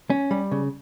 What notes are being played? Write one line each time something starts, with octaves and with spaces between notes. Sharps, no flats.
C#4
G3
C#3